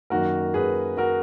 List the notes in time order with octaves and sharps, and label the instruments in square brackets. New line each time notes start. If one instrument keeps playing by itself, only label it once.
[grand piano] F#2 D#3 A#3 F#4 A#4
G#4 B4
F#4 A#4